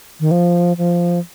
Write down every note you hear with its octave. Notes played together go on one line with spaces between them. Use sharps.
D#3
F3
F3